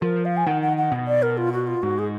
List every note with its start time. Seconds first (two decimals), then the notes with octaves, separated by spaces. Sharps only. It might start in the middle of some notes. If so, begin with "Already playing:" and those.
0.02 F3 A#4
0.25 F5
0.37 G#5
0.47 D#3 F#5
0.62 F#5
0.77 F#5
0.92 B2
1.07 D5
1.22 A#4
1.37 F4
1.53 F#4
1.67 F4
1.82 G#2 F#4
1.99 G#4